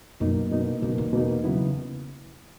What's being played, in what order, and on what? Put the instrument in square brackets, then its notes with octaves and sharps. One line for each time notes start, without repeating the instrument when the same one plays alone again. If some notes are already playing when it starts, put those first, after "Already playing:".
[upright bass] F#2 [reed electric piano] B2 A#3 D#4
[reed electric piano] B2 A#3 D#4
[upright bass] F#2 [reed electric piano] B2 A#3 D#4
[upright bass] E2
[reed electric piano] B2 A#3 D#4
C#3 F#3 B3 E4